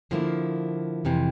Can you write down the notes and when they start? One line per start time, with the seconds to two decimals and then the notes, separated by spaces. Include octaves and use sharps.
0.11 D3 F3 A#3 E4
1.05 F2 C3 E3